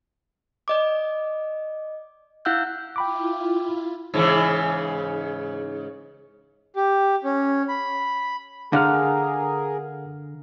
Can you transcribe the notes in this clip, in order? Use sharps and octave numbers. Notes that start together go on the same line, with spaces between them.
D5 D#5 D6
E4 F5 F#5 E6 F#6 G6
E4 F4 G5 B5 D6
G#2 C#3 E3
G4
C#4
B5
D3 G#4 A#4 F5 F#5 F6